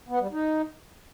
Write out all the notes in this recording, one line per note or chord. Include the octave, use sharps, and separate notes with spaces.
B3
G3
D#4